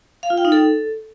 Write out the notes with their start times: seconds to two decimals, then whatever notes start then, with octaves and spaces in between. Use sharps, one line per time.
0.23 F5
0.30 F4
0.37 G5
0.45 D#4
0.52 A4